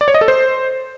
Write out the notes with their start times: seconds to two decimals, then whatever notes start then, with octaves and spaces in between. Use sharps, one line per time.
0.01 D5
0.08 C#5
0.14 D#5
0.21 A4
0.28 C5